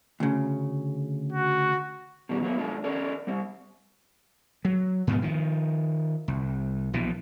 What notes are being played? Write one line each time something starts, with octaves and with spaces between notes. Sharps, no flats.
D2 C#3
F#4
B2 D#3 G3
F#3 A#3 B3
G#3 D4 F4
C#4 A4 A#4 D5
G3 C4
F#3
G#2 B2 B3
D#3 F3
C2
A#1 B2 E3